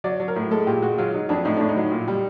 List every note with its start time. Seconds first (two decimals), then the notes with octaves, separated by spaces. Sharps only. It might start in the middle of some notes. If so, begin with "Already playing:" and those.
0.04 F#3 D5
0.20 F#3
0.28 A#4
0.36 A2
0.51 G#3 A4
0.67 A#2 G4
0.82 G#3 F#4
0.98 F#3 F4
1.14 F#3 D#4
1.29 F2 D4
1.45 A2 D#4
1.57 A2 D4
1.69 D#4
1.76 F#3
1.92 A#2
2.08 G3